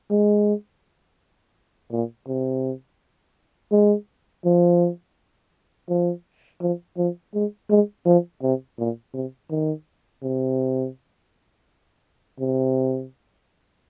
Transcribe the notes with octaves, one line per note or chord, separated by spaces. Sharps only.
G#3
A#2
C3
G#3
F3
F3
F3
F3
G#3
G#3
F3
C3
A#2
C3
D#3
C3
C3